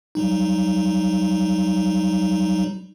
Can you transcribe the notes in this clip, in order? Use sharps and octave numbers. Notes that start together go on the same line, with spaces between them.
F#3 G3 D#4